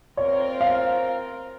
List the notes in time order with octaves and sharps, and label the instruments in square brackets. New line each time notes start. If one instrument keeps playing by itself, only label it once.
[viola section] C4 F4 A#4 [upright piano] C#5
[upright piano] F5